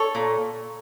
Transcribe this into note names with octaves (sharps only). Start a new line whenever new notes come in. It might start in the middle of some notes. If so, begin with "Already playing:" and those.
Already playing: A4 C#5
A#2